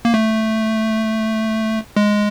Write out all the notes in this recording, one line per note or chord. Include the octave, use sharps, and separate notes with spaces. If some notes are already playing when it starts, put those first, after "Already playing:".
A#3
A3
G#3